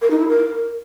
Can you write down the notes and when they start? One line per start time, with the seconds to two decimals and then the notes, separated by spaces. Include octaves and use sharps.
0.01 A#4
0.10 D#4
0.19 E4
0.28 A#4